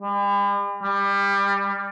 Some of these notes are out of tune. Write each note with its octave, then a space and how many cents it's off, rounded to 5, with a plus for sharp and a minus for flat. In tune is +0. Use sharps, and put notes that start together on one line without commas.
G3 +45
G3 +25